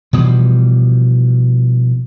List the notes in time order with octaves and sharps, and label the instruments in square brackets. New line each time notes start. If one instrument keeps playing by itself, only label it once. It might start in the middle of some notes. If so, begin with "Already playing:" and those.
[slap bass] B2 E3 F3 G3